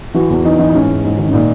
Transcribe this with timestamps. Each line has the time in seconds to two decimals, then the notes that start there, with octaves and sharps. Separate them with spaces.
0.14 E3 F#4
0.30 E2
0.45 E3 D#4
0.59 E3 D#4
0.70 D#4
0.74 G#2 C#4
0.89 G#2
1.04 G#2
1.18 D#3
1.28 C#4
1.33 A#2 D#4